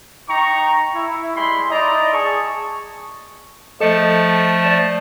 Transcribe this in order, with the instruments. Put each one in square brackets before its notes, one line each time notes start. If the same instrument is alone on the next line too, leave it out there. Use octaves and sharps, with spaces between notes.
[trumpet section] D#4 G5 A#5 C#6
E4
G3 G#3 B5 C6
D#4 E4 D5 D#5 A#5
G#4 A5 C#6
[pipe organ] F3 A3 A5 [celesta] A4 D#5 C#7
[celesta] D5 A6 E7